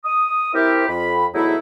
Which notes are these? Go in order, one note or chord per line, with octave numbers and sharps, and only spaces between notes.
D#6
C4 E4 G4 A#4
F2 B5
E2 G#2 F#3 A3 D#4 E4